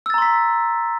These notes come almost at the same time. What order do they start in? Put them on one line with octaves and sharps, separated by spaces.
E6 A6 A#5 C6 B6